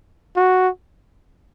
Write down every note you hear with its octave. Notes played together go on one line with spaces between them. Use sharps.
F#4